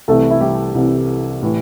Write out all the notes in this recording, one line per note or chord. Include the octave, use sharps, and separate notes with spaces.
C2 C3 E3 A3 A4
E4
G3 G4
C2 C3 E3
A2 E3